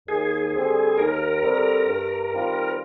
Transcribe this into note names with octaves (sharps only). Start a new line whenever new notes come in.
D#2 G#4
D3 G3 C4
D#2 A#4
D3 G3 C4
G2
D#3 G3 C4 F4